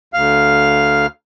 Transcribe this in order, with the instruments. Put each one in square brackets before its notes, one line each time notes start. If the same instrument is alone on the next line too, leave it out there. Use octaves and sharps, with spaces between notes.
[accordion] D2 F5 F6